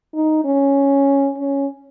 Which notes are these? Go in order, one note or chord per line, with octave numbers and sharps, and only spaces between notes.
D#4
C#4
C#4